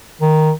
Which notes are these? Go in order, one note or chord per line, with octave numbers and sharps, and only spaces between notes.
D#3